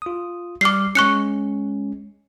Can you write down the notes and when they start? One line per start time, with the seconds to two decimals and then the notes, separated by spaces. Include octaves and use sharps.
0.02 F4 D#6
0.61 G3 D6 F6 C7
0.95 G#3 C#4 C#6 F#6 C#7